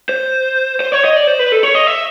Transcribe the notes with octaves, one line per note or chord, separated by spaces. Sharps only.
C5
C5
C#5
D#5
D5
C5
B4
A4
C#5
D#5
E5